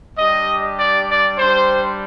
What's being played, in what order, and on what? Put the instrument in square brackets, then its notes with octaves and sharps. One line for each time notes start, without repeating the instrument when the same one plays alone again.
[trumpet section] G3 D4 G4 D#5
D5
D5
G3 D4 G4 C5